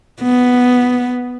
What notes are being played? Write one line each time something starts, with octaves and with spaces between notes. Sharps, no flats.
B3